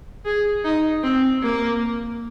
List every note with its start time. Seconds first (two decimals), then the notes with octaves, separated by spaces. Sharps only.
0.25 G#4
0.65 D#4
1.03 C4
1.43 A#3